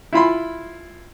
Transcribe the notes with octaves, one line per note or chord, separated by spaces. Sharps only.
E4 F4 B5 C6